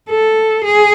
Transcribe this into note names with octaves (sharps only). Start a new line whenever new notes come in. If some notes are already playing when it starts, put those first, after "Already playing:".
A4
G#4